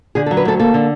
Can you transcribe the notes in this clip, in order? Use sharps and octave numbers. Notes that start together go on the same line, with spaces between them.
D3 G#4
A4
F#3
B4
D2 A4
A#3 A4
D3